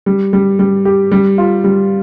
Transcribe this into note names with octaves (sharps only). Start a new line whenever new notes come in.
G3
G3
G3
G4
G3
F4
G3